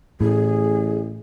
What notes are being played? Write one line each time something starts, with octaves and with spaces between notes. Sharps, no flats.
A1 A2 G#4